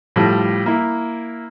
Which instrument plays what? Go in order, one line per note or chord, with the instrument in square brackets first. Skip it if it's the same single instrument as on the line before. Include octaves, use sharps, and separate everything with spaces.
[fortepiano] A2 F3 G3
A#3 E4